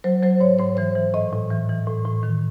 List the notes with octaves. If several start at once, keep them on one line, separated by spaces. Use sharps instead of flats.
F#3 C5
F#3 C5
G#2 C#5
G#2 C5
E3 C5
E3
A2 D#5
A2
E3
E3
A2
A2
D#3